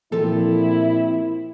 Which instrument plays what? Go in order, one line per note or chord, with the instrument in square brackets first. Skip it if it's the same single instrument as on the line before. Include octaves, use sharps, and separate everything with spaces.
[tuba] A#2 [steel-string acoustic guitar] F3 C4 G4 [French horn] E4 [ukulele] A4